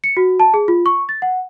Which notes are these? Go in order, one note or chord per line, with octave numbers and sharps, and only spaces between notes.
C#7
F#4
A5
G#4
F4
C#6
A6
F#5